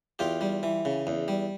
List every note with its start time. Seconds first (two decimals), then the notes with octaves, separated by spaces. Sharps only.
0.19 E2 F4 G4
0.41 G3
0.63 E3
0.85 C#3
1.07 E2
1.28 G3